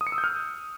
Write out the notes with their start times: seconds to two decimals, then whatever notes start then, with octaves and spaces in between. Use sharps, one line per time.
0.01 D#6
0.07 C#7
0.12 E6
0.18 G6
0.24 F6